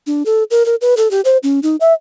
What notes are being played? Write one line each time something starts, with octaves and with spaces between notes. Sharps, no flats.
D4
A4
A#4
A#4
B4
A4
G4
C5
C#4
D#4
E5